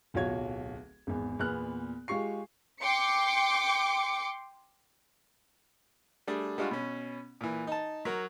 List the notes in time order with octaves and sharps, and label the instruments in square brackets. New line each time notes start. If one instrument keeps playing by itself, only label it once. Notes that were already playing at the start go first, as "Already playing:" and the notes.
[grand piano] D1 B1 F4 F#4 C#5 G#6
G#1 E2
E2 A#2 B3 F6 F#6
G#3 F4 G4 C#6 C7
[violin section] G5 C6 D6 C#7
[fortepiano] G3 A3 D4 G#4
G3 G#3 D4 F4 F#4
B2 C#4
A#2 E3
D#4 A5
F#3 A#4 C#6